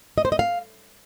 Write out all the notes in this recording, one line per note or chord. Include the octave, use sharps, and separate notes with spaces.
D#5
C5
D#5
F5